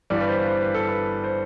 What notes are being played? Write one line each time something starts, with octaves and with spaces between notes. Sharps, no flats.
G1 G2 E3 G3 D5
B4
C5
C5
B4
A4
B4
C5